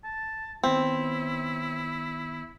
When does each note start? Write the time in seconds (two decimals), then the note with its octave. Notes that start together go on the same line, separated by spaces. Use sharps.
0.04 A5
0.64 D#3 B3 C4 E4